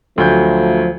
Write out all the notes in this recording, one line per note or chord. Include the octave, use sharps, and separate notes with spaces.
D2 F3 F#3 A3 G6